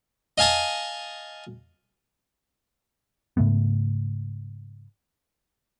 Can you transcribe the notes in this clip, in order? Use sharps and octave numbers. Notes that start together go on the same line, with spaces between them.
D#5 F5 G#5 A5 D#6
G#2 C#3 A3 B3